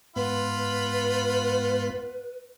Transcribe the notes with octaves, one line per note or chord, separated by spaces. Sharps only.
G#2 B3 F4 B4 F#5 B5